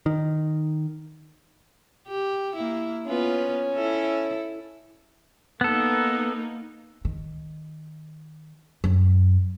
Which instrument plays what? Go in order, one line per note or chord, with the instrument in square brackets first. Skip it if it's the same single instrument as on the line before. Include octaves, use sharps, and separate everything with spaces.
[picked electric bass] D#3
[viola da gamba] G4
A#3 E4
[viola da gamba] B3 F4 B4 [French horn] C#4
[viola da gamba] E4 A4
[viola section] A#3 D#4 [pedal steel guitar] B3 A4
[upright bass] D#3
F#2